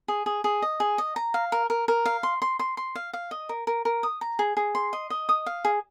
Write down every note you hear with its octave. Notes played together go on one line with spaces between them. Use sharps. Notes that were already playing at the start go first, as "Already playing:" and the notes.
G#4
G#4
G#4
D#5
G#4
D#5
A#5
F5
A#4
A#4
A#4
F5
C6
C6
C6
C6
F5
F5
D#5
A#4
A#4
A#4
D#6
A#5
G#4
G#4
C6
D#5
D#5
D#6
F5
G#4